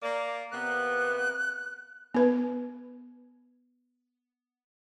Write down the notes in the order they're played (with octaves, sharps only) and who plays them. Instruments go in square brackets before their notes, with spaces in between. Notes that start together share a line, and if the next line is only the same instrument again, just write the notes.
[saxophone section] A#3 D5
[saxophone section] C3 A#3 B3 [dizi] F#6
[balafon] B3 B4